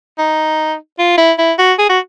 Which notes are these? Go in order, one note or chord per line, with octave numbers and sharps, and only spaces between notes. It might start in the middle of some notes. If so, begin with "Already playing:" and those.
D#4
F4
E4
E4
F#4
G#4
F#4